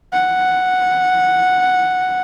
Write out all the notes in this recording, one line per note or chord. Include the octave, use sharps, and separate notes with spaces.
F#5